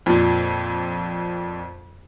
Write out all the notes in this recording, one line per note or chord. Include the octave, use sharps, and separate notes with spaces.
F2 A#2